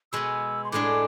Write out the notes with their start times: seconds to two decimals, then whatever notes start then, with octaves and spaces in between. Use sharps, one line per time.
0.12 B2 G#3 B3 E6
0.64 C6
0.72 A2 G#3 D4 G#4 D6